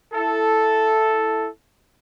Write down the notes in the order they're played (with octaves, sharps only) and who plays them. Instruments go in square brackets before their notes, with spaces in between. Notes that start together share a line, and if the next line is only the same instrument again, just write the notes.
[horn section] E4 A4